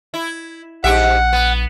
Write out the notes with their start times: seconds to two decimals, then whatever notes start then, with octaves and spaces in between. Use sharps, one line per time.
0.14 E4
0.84 A#1 G#2 G4 E5 F#5
1.33 B3